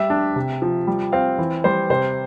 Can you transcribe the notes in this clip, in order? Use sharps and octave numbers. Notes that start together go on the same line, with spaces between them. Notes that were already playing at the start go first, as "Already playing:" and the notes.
Already playing: G3 E5
D4
C3
F3
G3
C4 F5
E3
G3 C5
C3 C5